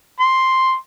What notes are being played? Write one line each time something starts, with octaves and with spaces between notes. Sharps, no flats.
C6